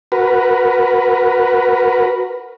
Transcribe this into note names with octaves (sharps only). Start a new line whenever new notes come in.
F#4 A#4 B4